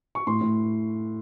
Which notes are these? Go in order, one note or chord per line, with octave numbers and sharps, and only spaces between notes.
C#6
A2 C6
A2